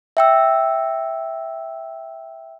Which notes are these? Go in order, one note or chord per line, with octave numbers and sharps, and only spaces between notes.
E5 G5 E6